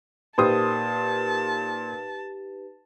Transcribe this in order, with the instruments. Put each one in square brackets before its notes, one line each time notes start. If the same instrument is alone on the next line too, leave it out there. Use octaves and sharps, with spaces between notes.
[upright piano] A#2 C5 D#6 [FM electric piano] D#4 G4 B4 [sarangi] A5